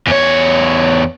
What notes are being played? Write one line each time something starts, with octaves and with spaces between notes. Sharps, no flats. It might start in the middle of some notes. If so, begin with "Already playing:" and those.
E2 C#5